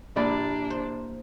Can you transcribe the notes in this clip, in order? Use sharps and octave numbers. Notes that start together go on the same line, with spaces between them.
A#1 A#3 D4 E4 G4 D5 B5
C5